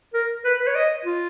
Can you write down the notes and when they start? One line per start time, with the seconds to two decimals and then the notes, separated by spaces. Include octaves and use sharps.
0.14 A#4
0.45 B4
0.60 B4
0.67 C#5
0.75 D#5
1.05 F4